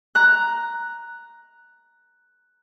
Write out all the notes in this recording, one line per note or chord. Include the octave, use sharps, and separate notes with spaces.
A#5 F#6